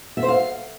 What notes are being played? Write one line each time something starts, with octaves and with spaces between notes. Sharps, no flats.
E5
C5
F5